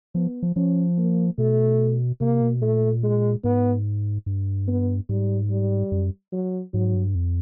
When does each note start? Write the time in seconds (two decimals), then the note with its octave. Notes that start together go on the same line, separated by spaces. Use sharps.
0.15 F3 B3
0.43 F3
0.56 F3 C#4
0.98 A#3
1.38 B2 A3
2.20 C3 A#3
2.41 B2
2.62 A#2 A3
3.03 G#3
3.44 G#2 B3
4.26 G2
4.68 B3
5.09 G#2 G3
5.50 G3
5.92 F#2
6.33 F#3
6.74 G#2 F#3
6.94 G2
7.15 F2